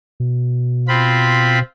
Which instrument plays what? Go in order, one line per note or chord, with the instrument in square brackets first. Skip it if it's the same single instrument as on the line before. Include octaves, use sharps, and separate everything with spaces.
[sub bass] B2
[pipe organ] C4 F4 B5